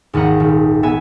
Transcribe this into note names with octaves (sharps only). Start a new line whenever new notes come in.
G#1 D#2 D#4 F#5 A#5
D#1
B3 E5 G#5